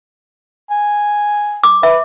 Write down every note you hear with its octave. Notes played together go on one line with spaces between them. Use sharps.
G#5
D6
B4 E5